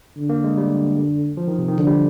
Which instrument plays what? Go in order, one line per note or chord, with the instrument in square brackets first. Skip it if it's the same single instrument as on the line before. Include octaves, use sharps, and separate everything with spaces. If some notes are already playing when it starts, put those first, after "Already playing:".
[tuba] D3
[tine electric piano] A#3
G#3
G3
F3
D#3
C3
D#3
[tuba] D3 [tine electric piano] F3
[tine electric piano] G3